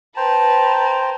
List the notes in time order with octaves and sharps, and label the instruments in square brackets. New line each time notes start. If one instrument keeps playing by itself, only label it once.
[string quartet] B4 A5 [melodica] C5 G5 A#5